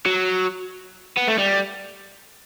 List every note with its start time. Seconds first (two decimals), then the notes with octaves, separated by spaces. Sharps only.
0.06 F#3
1.17 B3
1.28 A3
1.39 G3